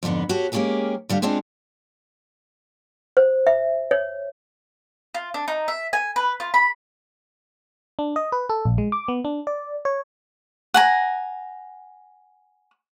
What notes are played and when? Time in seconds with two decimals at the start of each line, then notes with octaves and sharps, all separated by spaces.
0.03 F2 G#2 D3 B3 D#4
0.29 F#4 G4 A4 C#5
0.52 G#3 A#3 C#4 G4 G#4 A#4
1.09 D3 G3 G4 F5
1.22 G#3 B3 C4 D4 F4 G#4
3.17 C5
3.47 E5
3.91 C#5
5.14 F4
5.34 D4
5.48 D#4
5.68 E5
5.93 G#5
6.16 B4
6.40 F4
6.54 B5
7.99 D4
8.16 D#5
8.32 B4
8.49 A4
8.65 A#1
8.78 G#3
8.92 D6
9.08 B3
9.25 D4
9.47 D5
9.85 C#5
10.74 F#5 G#5 A#5